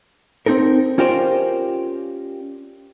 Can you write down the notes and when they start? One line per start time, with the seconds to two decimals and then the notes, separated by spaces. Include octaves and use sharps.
0.46 C4 D#4 A4 A#4
0.98 C#4 F4 G4 A#4 C5 D5